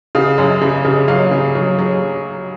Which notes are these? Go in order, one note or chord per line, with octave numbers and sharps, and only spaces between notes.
C#3 F5
F#2
C#3
C#3
F#3 F5
C#3
F#3
F#3